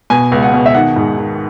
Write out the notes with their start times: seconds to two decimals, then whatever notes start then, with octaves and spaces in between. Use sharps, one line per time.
0.10 B2 G#5
0.32 C#2
0.43 F#5
0.53 B2
0.66 E5
0.74 D#3 F#5
0.96 G#2
1.17 D#3